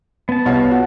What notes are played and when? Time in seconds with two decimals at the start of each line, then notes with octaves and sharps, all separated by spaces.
0.29 B3 A5
0.45 C2 C#5 F5
0.71 F4 F#4